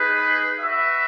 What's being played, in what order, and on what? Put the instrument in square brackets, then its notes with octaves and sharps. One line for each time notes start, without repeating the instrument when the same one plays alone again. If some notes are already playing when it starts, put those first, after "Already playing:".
Already playing: [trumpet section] D#4 G#4 B4
F#4 B4 E5